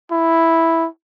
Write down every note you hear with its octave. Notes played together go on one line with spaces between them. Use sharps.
E4